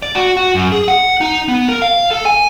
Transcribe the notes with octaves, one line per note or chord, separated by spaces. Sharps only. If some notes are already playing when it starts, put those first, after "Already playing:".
D5
F#4
F#4
F#2
G#4
F#5
D#4
B3
A#4
F5
A4
G#5